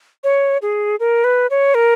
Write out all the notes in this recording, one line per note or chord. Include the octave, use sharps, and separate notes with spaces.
C#5
G#4
A#4
B4
C#5
A#4